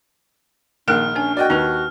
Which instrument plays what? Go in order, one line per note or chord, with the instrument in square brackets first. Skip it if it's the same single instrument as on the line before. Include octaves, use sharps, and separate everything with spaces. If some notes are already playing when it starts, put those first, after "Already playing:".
[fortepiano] A#1 D#3 F#6 [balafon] A#3 A#4 G5 [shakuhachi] D4 [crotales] F6
[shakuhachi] C#4 [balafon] D4 G#5
[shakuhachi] F#4 [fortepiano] D5 D#5 G5
[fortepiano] D#2 [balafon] D#4 B4